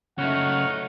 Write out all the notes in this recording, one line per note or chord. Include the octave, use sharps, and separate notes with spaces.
C#3 F#3 A3 D#4 C#5 F#5 F6